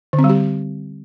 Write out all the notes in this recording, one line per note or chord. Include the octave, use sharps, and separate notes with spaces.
D3
C4
G3
G4